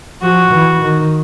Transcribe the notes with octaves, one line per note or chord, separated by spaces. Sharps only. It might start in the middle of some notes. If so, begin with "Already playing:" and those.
F3 F#4
E3
D#3